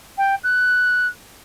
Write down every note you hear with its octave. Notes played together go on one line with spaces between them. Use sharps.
G5
F#6